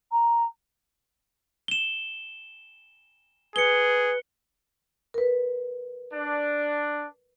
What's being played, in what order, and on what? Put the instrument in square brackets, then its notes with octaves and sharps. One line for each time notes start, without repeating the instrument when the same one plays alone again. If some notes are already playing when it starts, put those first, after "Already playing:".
[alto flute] A#5
[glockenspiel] E7 G7
[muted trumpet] G#4 [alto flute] B4 [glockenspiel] C#7 G7
[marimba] A#4 B4
[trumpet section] D4